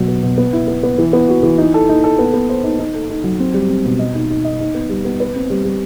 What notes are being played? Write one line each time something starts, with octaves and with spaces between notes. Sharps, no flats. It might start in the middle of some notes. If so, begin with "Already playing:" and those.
Already playing: B2 F#3
B3
B2
B3
E4
B3
B3
E3
B3
F#4
E3
D#4
A4
D#4
A4
B3
B3
C5
D#4
D#4
A4
D#4
F#3
C4
G3
C4
B2
D#5
D#4
D#4
D#5
D#4
B3
G3
B3
B4
C4
G3
G3